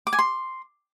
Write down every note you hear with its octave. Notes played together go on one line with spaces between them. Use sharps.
D6
G#5
C6